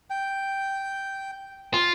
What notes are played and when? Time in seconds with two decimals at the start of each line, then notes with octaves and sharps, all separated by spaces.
0.10 G5
1.74 F4